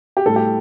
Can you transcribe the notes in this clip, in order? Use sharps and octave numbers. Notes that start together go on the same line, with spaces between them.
G4
A2 G3 A4
G4